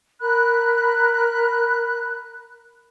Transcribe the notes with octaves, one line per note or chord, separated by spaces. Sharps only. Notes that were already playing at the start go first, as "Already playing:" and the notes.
A#4 B5 F#6